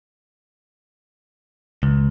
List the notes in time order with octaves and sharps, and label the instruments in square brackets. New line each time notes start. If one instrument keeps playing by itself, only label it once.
[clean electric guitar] C#2